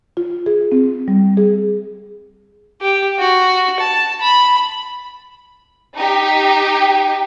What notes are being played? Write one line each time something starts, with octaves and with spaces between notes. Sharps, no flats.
F4
G#4
C4
G3
G#4
G4
F#4
A5
B5
D#4 G4